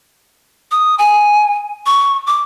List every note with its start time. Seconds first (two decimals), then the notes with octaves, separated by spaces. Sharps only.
0.71 D#6
0.99 G#5
1.86 C#6
2.27 D6